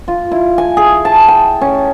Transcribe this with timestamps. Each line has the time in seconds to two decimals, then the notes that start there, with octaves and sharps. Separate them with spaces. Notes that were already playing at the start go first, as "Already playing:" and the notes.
0.08 F4
0.32 E4
0.58 G#5
0.77 G#4
1.05 A5
1.28 G5
1.61 C#4